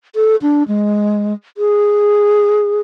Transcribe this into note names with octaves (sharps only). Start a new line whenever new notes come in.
A4
D4
G#3
G#4